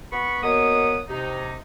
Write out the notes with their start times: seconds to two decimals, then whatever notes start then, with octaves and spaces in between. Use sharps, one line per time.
0.12 B3 B5 C#6
0.43 B2 A#3 B3 C#5 D#6
1.09 C3 D#4